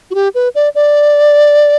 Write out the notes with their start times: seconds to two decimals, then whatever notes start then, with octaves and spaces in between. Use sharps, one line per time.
0.11 F#4
0.15 G4
0.35 B4
0.55 D5
0.75 D5